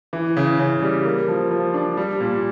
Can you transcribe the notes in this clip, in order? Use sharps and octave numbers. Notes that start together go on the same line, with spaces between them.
E3
C#3
C#3
G3
A#3
F3
F3
D4
G3
A#2